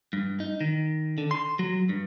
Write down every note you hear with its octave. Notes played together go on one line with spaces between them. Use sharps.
G2
D#4
D#3
D3
C6
F#3
G2